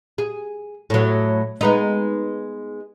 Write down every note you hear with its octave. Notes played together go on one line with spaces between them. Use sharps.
G#4
A2 F#3
G#3 B3 D#4